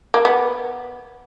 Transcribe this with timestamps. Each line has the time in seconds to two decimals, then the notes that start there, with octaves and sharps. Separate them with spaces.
0.14 A#3
0.25 B3